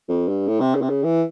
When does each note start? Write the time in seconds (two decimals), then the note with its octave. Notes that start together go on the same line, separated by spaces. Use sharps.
0.09 F2
0.28 G2
0.47 A2
0.60 C3
0.75 C#3
0.82 C3
0.89 C#3
1.04 E3